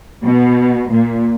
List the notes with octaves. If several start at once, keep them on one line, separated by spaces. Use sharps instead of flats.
B2
A#2